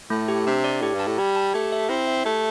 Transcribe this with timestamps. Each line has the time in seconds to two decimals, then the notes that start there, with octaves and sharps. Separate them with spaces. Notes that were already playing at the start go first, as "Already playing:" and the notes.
0.10 A2 A3
0.28 G4
0.46 C3 D4
0.64 D5
0.81 A2 G4
0.94 G2
1.00 A5
1.07 A2
1.18 G3 G4
1.36 A5
1.54 A3 G4
1.72 E5
1.89 C4 E4
2.07 E5
2.25 A3 G4